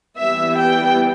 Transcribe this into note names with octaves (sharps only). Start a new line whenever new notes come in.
E3 G3 B3 E5
G5